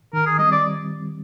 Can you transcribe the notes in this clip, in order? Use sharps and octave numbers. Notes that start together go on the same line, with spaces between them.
D#3 A#4
G#4
G3 C4 D#5
D5